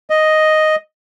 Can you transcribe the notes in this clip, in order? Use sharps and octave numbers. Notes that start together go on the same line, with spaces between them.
D#5